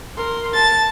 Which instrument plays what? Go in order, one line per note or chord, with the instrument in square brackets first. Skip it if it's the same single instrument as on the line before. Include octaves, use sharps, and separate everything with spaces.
[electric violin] A#4 C6
[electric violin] A5 [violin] A6